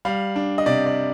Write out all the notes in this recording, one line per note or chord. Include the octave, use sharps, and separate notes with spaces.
G3 F5
D4
D#5
C3 D5
D5